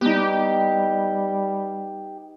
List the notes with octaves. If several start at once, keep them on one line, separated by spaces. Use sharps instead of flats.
G3 B3 D#4 G4